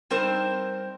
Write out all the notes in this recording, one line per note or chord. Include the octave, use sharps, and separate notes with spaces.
G3 C4 D#4 A#4 C5